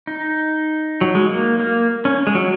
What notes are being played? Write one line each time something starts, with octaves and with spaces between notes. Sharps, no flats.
D#4
F#3
G#3
A#3
A#3
C#4
G#3
F#3